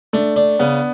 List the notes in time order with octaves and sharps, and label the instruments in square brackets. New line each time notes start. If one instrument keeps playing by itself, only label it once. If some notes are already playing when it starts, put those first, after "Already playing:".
[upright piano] A3 [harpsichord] D4
[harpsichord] D4
[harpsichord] C#3 [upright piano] B3